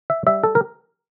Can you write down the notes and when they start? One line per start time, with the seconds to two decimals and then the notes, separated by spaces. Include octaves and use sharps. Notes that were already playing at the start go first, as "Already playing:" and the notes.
0.10 E5
0.27 G3 E5
0.44 A4
0.55 A#4